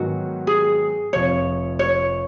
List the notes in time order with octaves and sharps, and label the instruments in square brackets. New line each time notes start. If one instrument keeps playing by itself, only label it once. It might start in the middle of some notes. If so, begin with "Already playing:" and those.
Already playing: [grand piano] G#2 D#3 F#3 B3 [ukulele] F#4
[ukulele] G#4
[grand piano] F1 F2 F3 [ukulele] C#5
[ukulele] C#5